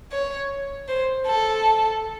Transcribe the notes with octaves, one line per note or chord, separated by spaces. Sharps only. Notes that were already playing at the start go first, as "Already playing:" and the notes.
C#5
C5
A4